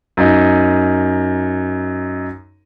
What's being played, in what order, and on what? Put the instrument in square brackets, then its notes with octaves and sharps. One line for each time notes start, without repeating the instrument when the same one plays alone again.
[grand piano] F#2 D#4